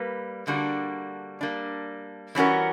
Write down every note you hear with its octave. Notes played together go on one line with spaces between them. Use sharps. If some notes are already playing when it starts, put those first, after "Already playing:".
Already playing: G3 A#3 B4
D3 G3 A#3 D4 F#4
G3 A#3 D4
E3 G3 C#4 F#4 A#4